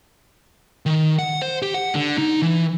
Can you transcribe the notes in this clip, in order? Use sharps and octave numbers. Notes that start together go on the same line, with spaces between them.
D#3
F#5
C5
G4
F#5
D3
D#4
E3